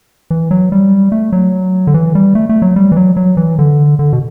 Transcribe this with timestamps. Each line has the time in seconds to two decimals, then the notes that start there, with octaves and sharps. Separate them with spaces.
0.31 E3
0.51 F#3
0.72 G3
1.12 A3
1.33 F#3
1.87 D3
1.94 E3
2.15 G3
2.35 A3
2.49 A3
2.62 F#3
2.76 G3
2.92 E3
2.97 F#3
3.17 F#3
3.37 E3
3.59 D3
3.99 D3
4.13 B2